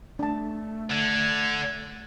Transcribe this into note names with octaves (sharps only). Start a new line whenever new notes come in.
A3 D4 A5
D3 G#6